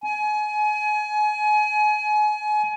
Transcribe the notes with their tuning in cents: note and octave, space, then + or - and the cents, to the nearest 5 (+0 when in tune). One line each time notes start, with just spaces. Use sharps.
G#5 +30